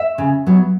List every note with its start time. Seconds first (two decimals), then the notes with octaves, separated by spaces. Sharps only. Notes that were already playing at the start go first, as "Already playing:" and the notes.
Already playing: E5
0.18 C#3
0.47 F#3 B3